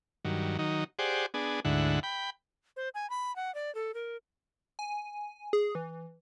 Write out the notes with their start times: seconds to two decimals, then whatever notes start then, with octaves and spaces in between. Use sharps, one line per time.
0.25 G2 D#3 F#3
0.59 D#3 F#3 D#4
0.99 G4 G#4 C5 D5 F#5
1.34 B3 D4 G#4
1.65 D2 G#2 D3 E4 F#5
2.03 G5 B5
2.76 C5
2.95 G#5
3.10 B5
3.36 F#5
3.55 D5
3.75 A4
3.94 A#4
4.79 G#5
5.53 G#4
5.75 E3